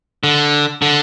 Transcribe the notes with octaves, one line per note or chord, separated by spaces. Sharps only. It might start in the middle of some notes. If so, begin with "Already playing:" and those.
D3
D3